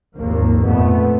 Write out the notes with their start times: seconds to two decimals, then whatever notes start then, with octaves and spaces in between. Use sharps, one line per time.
0.18 G#1 D#2 F3 A#3
0.61 F2 A#2 A3 B3